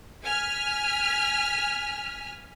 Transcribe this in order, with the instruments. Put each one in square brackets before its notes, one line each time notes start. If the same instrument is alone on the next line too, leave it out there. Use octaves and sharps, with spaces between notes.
[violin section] G#5 F6 B6